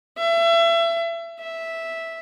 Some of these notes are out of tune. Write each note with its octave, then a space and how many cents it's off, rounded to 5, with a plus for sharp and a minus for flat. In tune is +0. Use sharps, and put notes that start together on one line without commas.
E5 +30
E5 -5